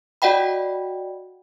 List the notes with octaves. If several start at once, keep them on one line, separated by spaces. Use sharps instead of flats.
F#4 D5 D#5 F#5 G5 B5